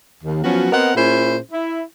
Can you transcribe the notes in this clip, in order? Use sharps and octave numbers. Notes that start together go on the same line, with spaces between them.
D#2
F3 F#3 B3 C#4 F#4
B3 C4 A#4 D#5 F#5
A#2 C#4 E4 G#4 C5
E4